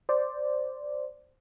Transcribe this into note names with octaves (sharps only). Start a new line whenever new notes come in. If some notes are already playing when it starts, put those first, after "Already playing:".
C5 D5